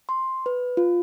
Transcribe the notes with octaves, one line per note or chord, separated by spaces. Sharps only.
C6
B4
F4